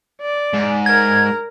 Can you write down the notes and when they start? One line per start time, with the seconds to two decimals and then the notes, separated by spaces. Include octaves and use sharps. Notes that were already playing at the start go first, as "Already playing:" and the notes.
0.22 D5
0.53 G#2
0.86 A#4 G#6